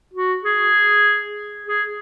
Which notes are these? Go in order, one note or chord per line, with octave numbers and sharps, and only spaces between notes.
F#4
G#4
G#4